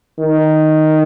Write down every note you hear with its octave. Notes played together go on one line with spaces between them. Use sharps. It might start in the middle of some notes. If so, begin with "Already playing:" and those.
D#3